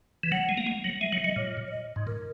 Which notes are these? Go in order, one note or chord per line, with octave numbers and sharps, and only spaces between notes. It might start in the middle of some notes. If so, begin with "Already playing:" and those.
E3
F#3 F#5
G#3
A#3
G#3
F#3
G#3 E5
F#3
F#3 D#5
A#2 C#5
C#5
D#5
G#2
A#2 A#4